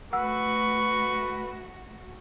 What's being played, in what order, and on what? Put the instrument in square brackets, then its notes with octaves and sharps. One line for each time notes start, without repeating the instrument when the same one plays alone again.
[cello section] A3 F#4 [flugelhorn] B4 [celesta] F#5 E6 [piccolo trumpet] C#6